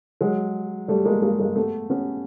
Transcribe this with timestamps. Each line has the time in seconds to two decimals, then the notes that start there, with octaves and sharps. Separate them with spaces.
0.21 F#3 G#3
0.88 G3 A3
1.05 G#3 A#3
1.22 G#3 A#3
1.39 G#3 A#3
1.56 A3 B3
1.90 B3 C#4